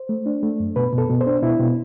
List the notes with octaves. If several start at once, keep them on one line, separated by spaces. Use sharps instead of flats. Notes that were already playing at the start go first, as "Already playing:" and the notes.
Already playing: C5
A3
D4
A3
F#2
B2 B4
B2
A4
B2
C5
D4
B2 E4
B2